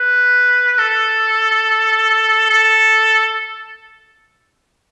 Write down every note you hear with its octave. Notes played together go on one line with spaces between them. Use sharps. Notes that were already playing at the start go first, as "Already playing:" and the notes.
Already playing: B4
A4
A4